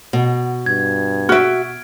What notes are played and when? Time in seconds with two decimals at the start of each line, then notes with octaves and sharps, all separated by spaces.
0.13 B2
0.66 G2 G#6
1.29 F#4 E5 F6 D7